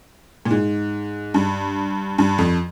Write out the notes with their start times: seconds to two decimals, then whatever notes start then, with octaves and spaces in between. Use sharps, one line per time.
0.45 A#2
0.51 G#2
1.34 G2
2.18 G2
2.38 F2